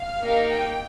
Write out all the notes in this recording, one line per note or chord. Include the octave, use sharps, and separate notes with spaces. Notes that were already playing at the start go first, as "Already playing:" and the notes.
Already playing: F5
A#3 D#4 G4
G5